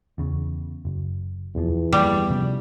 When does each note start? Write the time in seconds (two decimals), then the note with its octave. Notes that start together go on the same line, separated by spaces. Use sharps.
0.18 E2 C#3
0.85 F#1
1.55 E1 E2 F3
1.93 G1 F3 G3 A#3
2.30 C3 F3 C#4